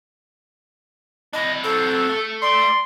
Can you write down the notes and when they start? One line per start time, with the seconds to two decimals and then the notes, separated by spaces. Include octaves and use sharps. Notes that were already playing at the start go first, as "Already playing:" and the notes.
1.33 D4 E4 D#5
1.64 F#3 C4 A4
2.09 A3
2.42 D5 C6